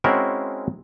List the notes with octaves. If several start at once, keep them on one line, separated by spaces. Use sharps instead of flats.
G#3 C4 C#4 E4 F#4 A#4